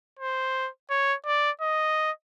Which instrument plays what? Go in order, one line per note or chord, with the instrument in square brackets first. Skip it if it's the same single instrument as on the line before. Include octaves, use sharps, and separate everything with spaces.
[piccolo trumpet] C5
C#5
D5
D#5